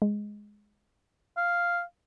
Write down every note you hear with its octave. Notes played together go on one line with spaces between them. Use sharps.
G#3
F5